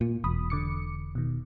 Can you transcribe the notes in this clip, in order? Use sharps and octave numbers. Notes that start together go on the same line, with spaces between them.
A#2
E1 B5 D#6
D3 D6 C#7
B2 D#3